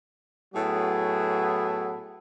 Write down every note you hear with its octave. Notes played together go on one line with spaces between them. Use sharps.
A2 F#3 B3 E4 F#4 G#4